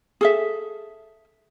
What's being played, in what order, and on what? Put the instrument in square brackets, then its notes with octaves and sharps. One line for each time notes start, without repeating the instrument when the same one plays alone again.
[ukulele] G#4 A4 E5